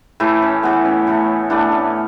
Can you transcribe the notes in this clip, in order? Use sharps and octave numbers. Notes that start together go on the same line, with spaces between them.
A2 E3 A3 E4
C#4
A2 E3 A3 B3
C#4
A2 E3 A3
A2 E3 A3 D4
C#4